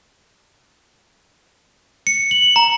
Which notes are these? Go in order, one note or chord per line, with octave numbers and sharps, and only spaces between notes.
C#7
F#7
A#5